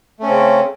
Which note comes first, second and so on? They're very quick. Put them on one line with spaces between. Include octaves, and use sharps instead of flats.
A3 C#4 C4 C#3